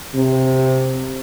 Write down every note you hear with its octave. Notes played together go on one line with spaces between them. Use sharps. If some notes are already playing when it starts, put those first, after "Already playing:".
C3